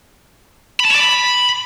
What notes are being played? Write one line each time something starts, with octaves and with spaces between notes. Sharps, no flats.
B5
A5
C#5
D5
B5